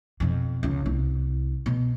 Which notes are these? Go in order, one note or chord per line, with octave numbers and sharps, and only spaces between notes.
F2 B2
C#2
C2
B2